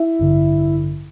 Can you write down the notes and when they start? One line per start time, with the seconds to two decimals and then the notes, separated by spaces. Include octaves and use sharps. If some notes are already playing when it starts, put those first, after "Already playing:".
Already playing: E4 E5
0.19 A1 G2 D3